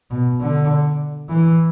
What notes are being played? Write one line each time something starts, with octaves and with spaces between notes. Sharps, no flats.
B2
D3
E3